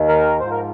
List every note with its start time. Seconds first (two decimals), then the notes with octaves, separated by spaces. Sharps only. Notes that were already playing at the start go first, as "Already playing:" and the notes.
Already playing: D#2 D#3
0.09 A#4
0.40 G#2 F3 C5
0.51 A#4